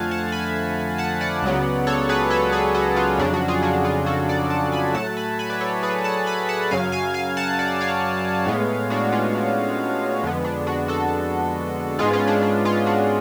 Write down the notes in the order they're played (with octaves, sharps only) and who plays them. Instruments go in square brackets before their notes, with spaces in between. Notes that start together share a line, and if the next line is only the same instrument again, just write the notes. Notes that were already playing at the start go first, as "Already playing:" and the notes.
Already playing: [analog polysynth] F2 D3 F3 A3 F5 F#5 G#5 A5
F#5 A5
G#5 B5
F#5 A5
D5 F#5
C#2 C#3 F#3 B3
A4 C#5
G#4 B4
A4 C#5
G#4 B4
F#4 A4
F4 G#4
F2 C#3 F#3 D4
D4 F#4
F4 G#4
D4 F#4
F4 G#4
F#4 A4
D5 F#5
F#5 A5
G#5 B5
A2 F#3 A3 F#5 A5
G#5 B5
G#5 B5
B4 D5
A4 C#5
G#4 B4
F#5 A5
G#5 B5
F#5 A5
F#2 C#3 F#3 F5 G#5
F5 G#5
F5 G#5
F#5 A5
D5 F#5
C#5 F5
A2 G#3 B3
D4 F#4
C#4 F4
D4
F2 D3 G#3 B3
D4
D4 F#4
F#4 A4
G#2 G#3 B3 F4 G#4
C#4 F4
D4
D4
C#4 F4
D4 F#4